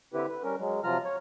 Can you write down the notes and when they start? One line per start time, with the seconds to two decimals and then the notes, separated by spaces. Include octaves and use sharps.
0.14 D3 C4 E4 G4 B4
0.29 B4
0.43 G3 C#4 A#4
0.59 F#3 G#3
0.84 C3 F3 F#3 F4 A#5 F6
1.05 C#5